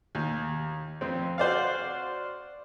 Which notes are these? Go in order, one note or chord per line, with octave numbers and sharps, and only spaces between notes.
D#2
F2 C4
F#4 C5 D5 F5